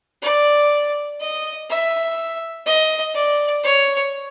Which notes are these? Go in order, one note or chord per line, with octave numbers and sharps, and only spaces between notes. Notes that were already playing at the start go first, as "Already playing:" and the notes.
D5
D#5
E5
D#5
D5
C#5